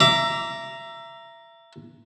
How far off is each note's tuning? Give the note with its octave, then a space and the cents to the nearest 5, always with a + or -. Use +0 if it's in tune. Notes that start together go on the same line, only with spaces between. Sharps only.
E5 +25 A#5 +0 D6 -20